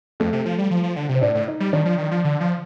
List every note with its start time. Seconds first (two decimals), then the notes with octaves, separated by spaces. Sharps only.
0.20 F2 A3 A4
0.33 C3
0.46 F3
0.58 G3
0.71 F3
0.83 F3
0.96 D3
1.09 C3
1.15 C5
1.21 A2 D4 D5
1.35 A2
1.47 D#4 D#5
1.60 G3
1.73 D#3 D4 D5
1.85 F3
1.98 D#3
2.11 F3
2.24 D3
2.40 F3